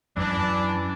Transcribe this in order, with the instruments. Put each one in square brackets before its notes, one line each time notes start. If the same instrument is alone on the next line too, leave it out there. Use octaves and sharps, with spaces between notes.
[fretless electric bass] F#2 [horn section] E3 D4